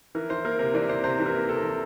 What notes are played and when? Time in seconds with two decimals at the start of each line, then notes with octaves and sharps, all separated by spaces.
0.15 E3 A#4
0.30 E3 C5
0.45 A#3 A#4
0.59 C3 A#4
0.74 E3 D5
0.89 C3 C5
1.04 C3 C5
1.20 E3
1.26 A#4
1.34 A#3
1.49 C3 A4
1.63 E3